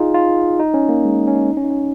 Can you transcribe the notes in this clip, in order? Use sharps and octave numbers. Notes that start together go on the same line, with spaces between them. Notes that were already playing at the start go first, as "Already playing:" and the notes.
Already playing: D#4 F4 G#4
F4
D#4
C#4
A#3
G#3
C#4
D#4
C#4
D#4
C#4
D#4
C#4